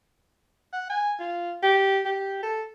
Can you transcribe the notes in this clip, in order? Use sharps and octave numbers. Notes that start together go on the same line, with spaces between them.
F#5
G#5
F4
G4
G4
A4